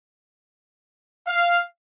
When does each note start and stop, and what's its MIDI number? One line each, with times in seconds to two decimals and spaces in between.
1.27 1.60 77